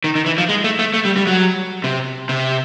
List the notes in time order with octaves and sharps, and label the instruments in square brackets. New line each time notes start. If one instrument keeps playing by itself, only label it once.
[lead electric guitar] D#3
D#3
E3
F3
G#3
A3
A3
A3
G3
G3
F#3
C3
C3